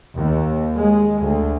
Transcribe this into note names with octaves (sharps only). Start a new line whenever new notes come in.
D#2
G#3
D2